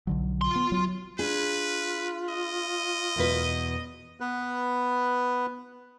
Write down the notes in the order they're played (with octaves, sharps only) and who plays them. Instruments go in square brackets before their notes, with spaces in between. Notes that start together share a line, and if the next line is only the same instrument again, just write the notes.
[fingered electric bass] B1 D3 F#3
[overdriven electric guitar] F4 C6
[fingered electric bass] B3
F#3
[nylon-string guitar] D4 G#4 [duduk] F4 [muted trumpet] B4
[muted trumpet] D#5
[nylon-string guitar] E2 B2 B4
[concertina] B3 B4